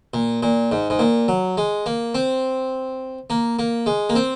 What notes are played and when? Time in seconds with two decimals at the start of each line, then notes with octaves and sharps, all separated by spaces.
0.14 A#2
0.43 A#2
0.72 G#2
0.90 G#2
0.99 A#2
1.28 F#3
1.57 G#3
1.86 A#3
2.14 C4
3.30 A#3
3.59 A#3
3.86 G#3
4.09 A#3
4.15 C4